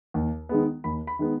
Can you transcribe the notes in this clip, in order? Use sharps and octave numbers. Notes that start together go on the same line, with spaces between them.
D#2
D#3 G#3 B3
D#2 B5
B5
D#3 G#3 B3